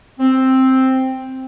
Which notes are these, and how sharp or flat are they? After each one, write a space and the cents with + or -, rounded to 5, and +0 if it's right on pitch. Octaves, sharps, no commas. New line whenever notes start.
C4 +5